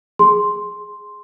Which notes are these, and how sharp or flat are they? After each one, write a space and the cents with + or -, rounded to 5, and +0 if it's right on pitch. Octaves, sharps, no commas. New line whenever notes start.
G#4 +0 C6 +0